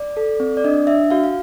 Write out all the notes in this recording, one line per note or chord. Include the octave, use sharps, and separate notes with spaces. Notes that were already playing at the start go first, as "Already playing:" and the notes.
Already playing: D5
A4
C4
D5
D4 D#5
D4 E5
F#4 F5
F5